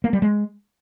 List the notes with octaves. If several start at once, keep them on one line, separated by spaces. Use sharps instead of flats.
A#3
G3
G#3